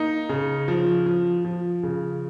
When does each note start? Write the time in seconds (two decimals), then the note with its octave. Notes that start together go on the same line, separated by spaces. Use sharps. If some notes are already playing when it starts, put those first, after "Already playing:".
Already playing: A#3 D#4
0.29 C#3
0.68 F3
1.06 F3
1.45 F3
1.83 C#3